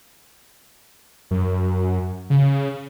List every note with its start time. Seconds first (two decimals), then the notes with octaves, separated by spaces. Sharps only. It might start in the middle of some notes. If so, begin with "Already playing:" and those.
1.31 F#2
2.30 C#3